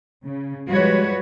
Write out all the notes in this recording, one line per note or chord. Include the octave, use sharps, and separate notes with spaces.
C#3
F3 G3 G#3 F#4 B4 C#5